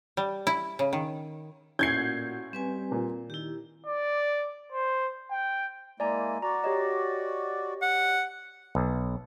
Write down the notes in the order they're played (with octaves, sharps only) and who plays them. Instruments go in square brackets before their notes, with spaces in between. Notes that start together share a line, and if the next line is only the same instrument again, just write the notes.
[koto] G3
E4
C#3
D#3
[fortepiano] A1 [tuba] A#2 [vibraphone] E4 F#4 F#5 [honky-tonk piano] G6 G#6 C7
[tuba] G3 [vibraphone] C4 B4 G#5
[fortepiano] A#2
[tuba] D#3 [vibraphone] E4 G4
[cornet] D5
C5
G5
[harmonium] G#3 A#3 E4 [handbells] D5 G#5 A#5
[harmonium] F#4 D5 [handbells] A#5
[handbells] G4 C#5 D#5
[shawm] F#5
[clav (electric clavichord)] B1